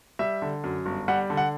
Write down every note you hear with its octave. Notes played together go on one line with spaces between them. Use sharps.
G3 E5
D3
F#2
G1
G3 F#5
D3
F#5